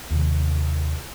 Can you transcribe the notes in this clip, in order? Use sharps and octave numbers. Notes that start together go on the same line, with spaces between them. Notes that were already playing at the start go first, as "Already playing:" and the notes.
D#2 C3